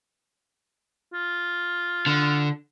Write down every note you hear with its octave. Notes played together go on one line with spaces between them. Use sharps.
F4
D3